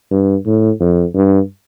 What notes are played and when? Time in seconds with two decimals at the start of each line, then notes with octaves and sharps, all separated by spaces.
0.11 G2
0.46 A2
0.80 F2
1.15 G2